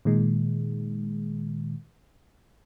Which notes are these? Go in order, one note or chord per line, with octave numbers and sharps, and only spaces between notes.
A#2 D#3 G#3